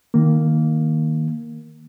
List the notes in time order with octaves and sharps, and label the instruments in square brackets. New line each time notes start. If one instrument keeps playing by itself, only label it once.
[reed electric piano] D#3 A#3